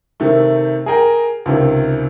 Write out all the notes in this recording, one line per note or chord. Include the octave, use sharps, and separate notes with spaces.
C3 D#3 A3
G#4 A#4 G5
C#2 C3 D#3